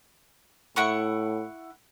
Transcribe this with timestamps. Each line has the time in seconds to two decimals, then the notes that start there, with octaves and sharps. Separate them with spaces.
0.76 A2 E4 F#5 C#6